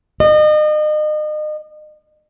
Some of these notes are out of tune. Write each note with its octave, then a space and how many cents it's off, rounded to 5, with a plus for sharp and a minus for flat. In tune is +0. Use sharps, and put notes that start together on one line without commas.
D#5 -35